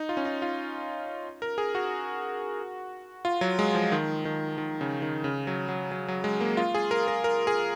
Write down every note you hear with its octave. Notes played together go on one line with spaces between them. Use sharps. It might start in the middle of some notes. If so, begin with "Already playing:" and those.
Already playing: D#4
F4
C#4
D#4
F4
A#4
G#4
F#4
F4
F#3
G#3
F3
D#3
D#3
D#3
C#3
D#3
C#3
F#3
F#3
F#3
F#3
G#3
A#3
F4
G#4
A#4
A#4
A#4
G#4